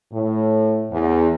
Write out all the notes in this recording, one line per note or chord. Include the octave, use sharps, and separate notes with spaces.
A2
E2